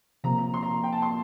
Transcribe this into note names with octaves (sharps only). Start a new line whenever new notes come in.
C3 F3 A#3 A#5
A#5
C6
A#5
G5
A5
C6